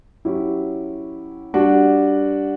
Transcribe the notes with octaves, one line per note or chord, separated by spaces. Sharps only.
F#3 C#4 E4 G4
G3 D4 F#4